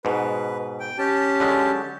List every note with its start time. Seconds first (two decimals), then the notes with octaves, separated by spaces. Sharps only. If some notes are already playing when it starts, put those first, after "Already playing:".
0.05 G#2 B2 B4
0.80 G5
0.98 C#4 G4 A5
1.40 D3 F#3 G#3